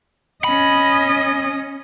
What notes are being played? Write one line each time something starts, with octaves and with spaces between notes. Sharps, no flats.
C#4 D#5 B5